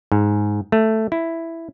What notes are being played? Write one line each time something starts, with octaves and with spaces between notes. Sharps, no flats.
G#2
A3
E4